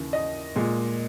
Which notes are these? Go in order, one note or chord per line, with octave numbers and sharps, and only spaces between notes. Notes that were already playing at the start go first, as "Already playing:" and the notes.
Already playing: D#2 C#3 E3
D#5
A#2 G#3